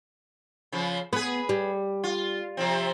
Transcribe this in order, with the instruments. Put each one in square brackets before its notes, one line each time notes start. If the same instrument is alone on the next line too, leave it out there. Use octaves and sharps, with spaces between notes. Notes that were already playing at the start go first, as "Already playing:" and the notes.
[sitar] C#3 F3
[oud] B3 [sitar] G#4 B4
[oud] G3
[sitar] F4
C3 F3 C4